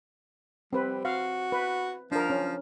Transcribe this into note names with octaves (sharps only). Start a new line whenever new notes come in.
G3 C4 B4
F#4 F5
B4
F3 D4 A#4
C#4